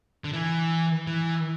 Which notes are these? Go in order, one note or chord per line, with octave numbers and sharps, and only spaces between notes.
D3
E3
E3